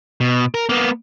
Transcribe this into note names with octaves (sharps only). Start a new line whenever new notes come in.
B2
A#4
A#3 B3